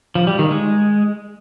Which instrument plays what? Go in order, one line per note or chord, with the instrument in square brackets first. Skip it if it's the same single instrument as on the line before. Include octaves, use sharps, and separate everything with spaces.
[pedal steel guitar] F3
G3
D#3
G#3